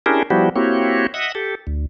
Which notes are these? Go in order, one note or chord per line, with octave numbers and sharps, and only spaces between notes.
C#4 D4 E4 G4 G#4 A#4
F3 G3 B3 E4 F#4 G4
A#3 C4 E4 F#4 G4 C#5
D#5 E5 F#5
G4 A4
D2